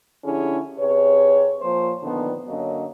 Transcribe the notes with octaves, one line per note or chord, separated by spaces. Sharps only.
F2 D3 C#4 E4 G4 G#4
C3 G#4 B4 C#5
A#2 F3 C5
A#2 D3 D#3 F3 B3
F#2 D3 F#3 A#3 C#4 D#5